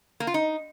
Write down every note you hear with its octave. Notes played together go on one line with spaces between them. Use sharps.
A#3
F4
D#4